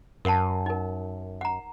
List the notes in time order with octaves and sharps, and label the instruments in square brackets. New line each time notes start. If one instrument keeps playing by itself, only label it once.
[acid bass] F#2 [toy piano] A#4 F#5 A5
[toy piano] D#4 A#4
F#5 A#5